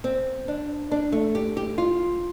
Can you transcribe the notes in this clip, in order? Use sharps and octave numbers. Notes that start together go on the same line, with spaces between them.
C4
D4
D4
A3
G4
G4
F4